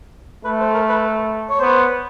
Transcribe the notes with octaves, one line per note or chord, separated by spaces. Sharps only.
A3 B4
C5
A#4
B4
C#5
B3 C5